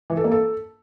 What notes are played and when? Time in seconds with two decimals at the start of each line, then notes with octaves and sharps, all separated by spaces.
0.10 E3
0.17 A4
0.24 A#3
0.31 A4